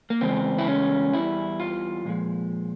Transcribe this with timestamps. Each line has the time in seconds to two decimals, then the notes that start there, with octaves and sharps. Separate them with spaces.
0.10 A#3
0.21 E2 C#3 G#3 C4
0.58 E4
0.68 C#4
1.13 E2 E3 G3 E4
1.60 F4
2.05 A#2 F3 G#3